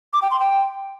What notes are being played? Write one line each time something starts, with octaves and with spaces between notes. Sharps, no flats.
D6
G5
C6
G5